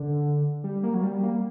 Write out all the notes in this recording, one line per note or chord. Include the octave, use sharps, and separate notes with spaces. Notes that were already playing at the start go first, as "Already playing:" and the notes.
Already playing: D3
G3
A#3
F#3
G3
A#3